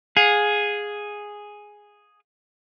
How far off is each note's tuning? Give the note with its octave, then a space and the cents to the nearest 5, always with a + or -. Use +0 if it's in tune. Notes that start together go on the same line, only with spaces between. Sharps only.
G#4 +0 F5 +35